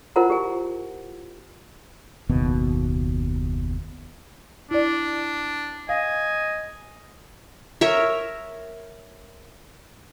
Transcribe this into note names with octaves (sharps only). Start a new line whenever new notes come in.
E4 F4 A#4 C5 F#5 A#5
G4 G#5
F#1 D#2 B2
D4 E4 D5
D#5 F5 G#5
A#4 C#5 E5